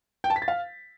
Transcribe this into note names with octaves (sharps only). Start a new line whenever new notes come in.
G5
A5
B6
A6
F5